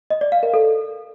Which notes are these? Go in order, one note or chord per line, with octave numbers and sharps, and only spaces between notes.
D#5
D5
F5
A#4
A4